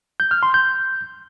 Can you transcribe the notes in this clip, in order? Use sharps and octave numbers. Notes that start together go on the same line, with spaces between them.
G6
F6
C6
G6